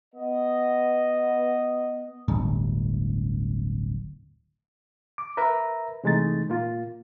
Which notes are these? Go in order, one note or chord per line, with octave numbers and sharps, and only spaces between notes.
B3 D#5
D1 G1
D6
A#4 B4 E5 A#5
C3 E3 G#3 A3 D#4 A6
A#2 A#3 F4